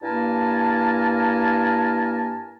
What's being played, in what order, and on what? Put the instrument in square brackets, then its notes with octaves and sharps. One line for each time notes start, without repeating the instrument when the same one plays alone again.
[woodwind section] G2 A#3 E4 A#4 G#5 A5